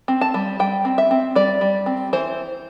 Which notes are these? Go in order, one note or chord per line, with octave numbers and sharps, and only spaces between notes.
C4
A5
G3
G3 G5
C4
E5
C4
G3 D5
G3
C4
E3 C5